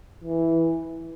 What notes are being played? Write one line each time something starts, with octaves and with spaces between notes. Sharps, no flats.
E3